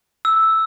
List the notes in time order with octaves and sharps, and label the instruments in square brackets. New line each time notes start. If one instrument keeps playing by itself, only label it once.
[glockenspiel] E6